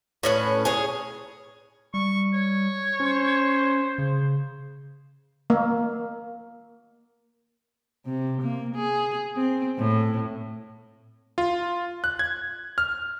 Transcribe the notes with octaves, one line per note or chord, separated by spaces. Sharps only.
A2 C#4 B4
G#4 C#5
G3 C#6
C#5
C#4 C5
C#3
A#3
C3
A#3
G#4
C4
A2
F4
F#6
G#6
F6